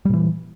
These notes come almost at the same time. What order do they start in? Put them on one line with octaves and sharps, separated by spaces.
G3 A#2 E3